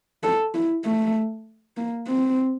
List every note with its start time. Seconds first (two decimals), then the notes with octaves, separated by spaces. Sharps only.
0.24 A4
0.55 E4
0.85 A3
1.77 A#3
2.08 C4